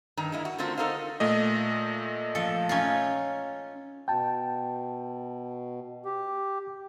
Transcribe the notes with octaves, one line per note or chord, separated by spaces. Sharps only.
G2 D#3 A#5
G#3 A#3 E4
F#4
D3 A3 C4 F4 F#4 A#4
D#4 A4 A#4 C5 F5
A#2 A3 D#5
F3 A4
C#4 D#4 F4
B2 G5 A5
G4